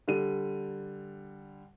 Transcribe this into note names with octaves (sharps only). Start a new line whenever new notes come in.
D3 G3 D#7